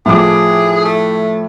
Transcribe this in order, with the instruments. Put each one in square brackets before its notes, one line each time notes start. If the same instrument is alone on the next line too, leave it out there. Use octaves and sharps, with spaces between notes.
[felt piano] A2 F3 D6 [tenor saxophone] G#4
[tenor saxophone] A3